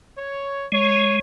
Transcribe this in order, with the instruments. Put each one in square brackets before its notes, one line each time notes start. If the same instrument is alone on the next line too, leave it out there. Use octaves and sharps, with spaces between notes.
[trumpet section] C#5
[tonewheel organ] G#3 [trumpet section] C#5